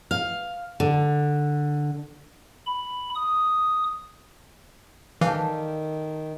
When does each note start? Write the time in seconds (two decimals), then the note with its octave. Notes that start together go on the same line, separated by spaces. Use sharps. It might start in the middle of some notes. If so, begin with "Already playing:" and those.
0.11 F5
0.80 D3
2.66 B5
3.15 D#6
5.21 D#3 E3 G4 A4 D5 F5